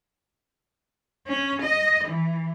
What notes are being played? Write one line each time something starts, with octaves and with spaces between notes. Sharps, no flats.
C#4
D#5
E3